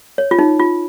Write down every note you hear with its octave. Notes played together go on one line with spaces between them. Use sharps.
C#5
F4
D#4
F4